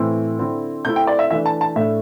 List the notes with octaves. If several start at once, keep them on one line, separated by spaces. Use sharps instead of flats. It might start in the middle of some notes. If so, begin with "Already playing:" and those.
Already playing: A2 E3 C4 E4
D3 C4 E4
C3 A3 C4 E4 G6
G5
D5
E5
E3 A3 D4 E5
A5
A5
A2 A3 D4 E5